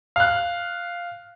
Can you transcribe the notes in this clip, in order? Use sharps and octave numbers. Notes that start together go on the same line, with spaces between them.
F5 F#6